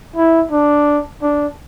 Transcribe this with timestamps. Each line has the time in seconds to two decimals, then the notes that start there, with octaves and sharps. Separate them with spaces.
0.16 E4
0.51 D4
1.22 D4